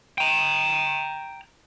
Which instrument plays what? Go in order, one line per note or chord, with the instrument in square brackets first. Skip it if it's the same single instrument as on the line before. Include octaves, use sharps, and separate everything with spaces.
[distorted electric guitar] G5 A#5